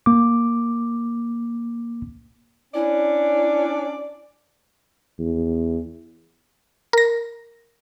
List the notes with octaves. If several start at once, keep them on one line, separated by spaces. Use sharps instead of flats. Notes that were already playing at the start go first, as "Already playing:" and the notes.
A#3 D6
C#4 D4 E4 D5
E2
A#4 A#6